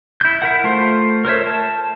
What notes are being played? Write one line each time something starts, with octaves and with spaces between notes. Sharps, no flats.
E4 G6
E4 A#4 F#5
A3 F4 C5
A#4 C5 C#5 E5
A5